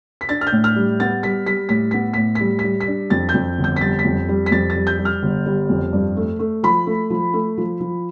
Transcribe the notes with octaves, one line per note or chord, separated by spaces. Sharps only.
B6
D4 A6
F6
G6
A2
F6
G3
B3 A6
G3 B6
G3 B6
A2 B6
B3 B6
A2 B6
G3 B6
G3 B6
B6
D4
F2 A6
G6
F2
G1
G6
B6
G3 A6
B6
F2
G3
B6
F2 A6
A6
G3
G6
G3
F6
G1
G3
F2
G2
A3
A3
F3 B5
A3
F3
A3
F3
F3